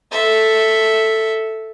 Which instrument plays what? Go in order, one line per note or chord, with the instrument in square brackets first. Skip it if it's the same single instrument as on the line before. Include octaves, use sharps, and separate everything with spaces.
[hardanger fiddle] A4 E5